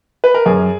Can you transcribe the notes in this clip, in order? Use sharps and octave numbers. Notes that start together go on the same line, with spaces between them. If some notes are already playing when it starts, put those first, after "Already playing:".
B4
A#4
F#2 G#4